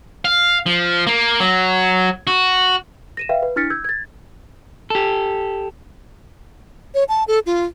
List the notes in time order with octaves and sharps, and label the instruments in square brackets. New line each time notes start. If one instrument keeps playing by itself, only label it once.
[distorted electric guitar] F5
F3
A#3
F#3
F#4
[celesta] A#6 D#7 E7
B4 E5 F5 G5
B4
D4 E4 F6 A6 B6 C#7
E6 G6 G#6
G#6 A6
[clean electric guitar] G4 A4
[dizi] C#5
A5
A4
F4